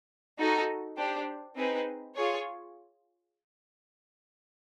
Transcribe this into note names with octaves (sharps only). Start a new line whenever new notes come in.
D#4 F#4 A4
D4 G4 C5
C4 D#4 G#4 B4
F4 G#4 C#5